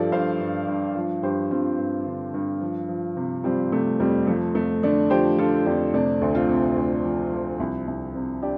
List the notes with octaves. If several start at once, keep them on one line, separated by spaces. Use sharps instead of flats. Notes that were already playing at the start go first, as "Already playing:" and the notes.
Already playing: G2 F3 G4 A4 D5
G2 C5 F5
G2
G2
F3
G2 G4 C5
G2 C4 F4
G2
D3
G2
F3
F3
C3
F3 G3 C4
C3 A3
F2 G3
F3 A3
F2 A3
D3 A3 D4
F3 G4 C5
D3 F4 A4
F2 D4 G4
C3 A3 D4
D2
C4 F4
C3
D2
F3
F3
C2
C2
C3
D4 G4